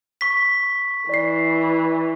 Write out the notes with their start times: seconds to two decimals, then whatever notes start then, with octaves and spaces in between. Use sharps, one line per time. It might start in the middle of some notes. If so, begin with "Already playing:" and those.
0.21 C#6 B6
1.09 E3 D5 C7